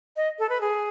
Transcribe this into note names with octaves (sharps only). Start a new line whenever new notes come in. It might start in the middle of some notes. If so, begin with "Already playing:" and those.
D#5
A4
B4
G#4